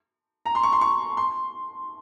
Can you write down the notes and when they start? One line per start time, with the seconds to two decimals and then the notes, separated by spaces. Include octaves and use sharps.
0.46 A#5
0.55 C6
0.63 C#6
0.72 C6
0.81 C#6
1.17 C6